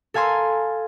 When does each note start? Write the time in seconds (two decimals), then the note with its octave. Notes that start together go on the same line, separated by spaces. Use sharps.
0.14 A4 F5 G#5 A#5 C6 E6